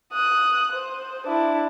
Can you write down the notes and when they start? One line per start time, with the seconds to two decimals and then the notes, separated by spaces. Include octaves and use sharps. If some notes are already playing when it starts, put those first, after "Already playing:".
0.13 D#6 F#6
0.72 C5
1.27 D4 E4